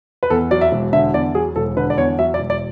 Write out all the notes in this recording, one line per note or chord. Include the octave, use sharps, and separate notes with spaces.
B4
E2 A4
F#3 D5
E5
E1
D3 E5
E2 D5
F#3 G#4
E1 A4
D3 B4
D5
E2 C#5
F#3 E5
D5
E1
D5